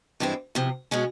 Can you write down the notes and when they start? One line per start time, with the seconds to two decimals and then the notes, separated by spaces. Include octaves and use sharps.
0.20 G2 E3 G#3 C4 E4
0.55 E2 C3 F3
0.91 B2 G#3 C#4